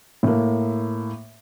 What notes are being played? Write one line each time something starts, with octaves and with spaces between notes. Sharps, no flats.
A2 A#3